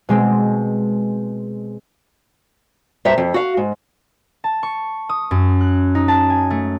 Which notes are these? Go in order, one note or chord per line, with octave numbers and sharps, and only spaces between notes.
B2 G#3 C4
G2 C5 E5 A#5
F2
F#4 F5
G#2
A5
C#6
D#6
F#2
F#6
D#4
A5
G#5
A3